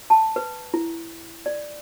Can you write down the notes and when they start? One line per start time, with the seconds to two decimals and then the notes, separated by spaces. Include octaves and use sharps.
0.10 A5
0.36 B4
0.74 E4
1.46 D5